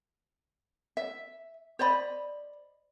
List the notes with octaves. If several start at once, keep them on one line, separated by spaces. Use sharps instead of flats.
E5
C5 D5 D#5 B5